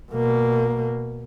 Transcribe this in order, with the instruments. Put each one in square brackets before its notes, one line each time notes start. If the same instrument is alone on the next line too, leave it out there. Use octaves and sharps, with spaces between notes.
[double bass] B2 A#3